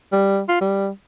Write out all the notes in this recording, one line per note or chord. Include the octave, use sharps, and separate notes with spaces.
G3
F4
G3